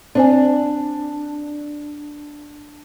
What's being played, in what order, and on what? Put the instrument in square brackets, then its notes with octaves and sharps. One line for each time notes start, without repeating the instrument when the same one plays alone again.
[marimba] C4 C5 G#5 [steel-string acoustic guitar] D4